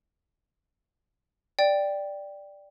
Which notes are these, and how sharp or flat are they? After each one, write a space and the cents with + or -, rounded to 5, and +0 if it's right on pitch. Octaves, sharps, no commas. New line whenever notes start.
D5 +0 G5 +0